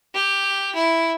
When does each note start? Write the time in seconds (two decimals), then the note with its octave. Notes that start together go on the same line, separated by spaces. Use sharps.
0.14 G4
0.75 E4